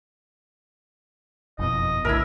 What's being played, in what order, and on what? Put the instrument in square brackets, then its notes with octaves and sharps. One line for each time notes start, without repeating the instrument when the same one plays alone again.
[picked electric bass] F#1 F2 B2 [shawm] D#5
[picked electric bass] B1 A2 D3 [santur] E4 A#4 [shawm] E5